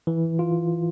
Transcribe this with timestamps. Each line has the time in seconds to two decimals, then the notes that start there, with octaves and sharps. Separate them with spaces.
0.07 E3
0.39 F4